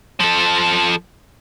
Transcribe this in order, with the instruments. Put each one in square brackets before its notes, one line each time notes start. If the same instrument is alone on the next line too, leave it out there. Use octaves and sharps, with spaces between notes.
[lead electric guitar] F3 A4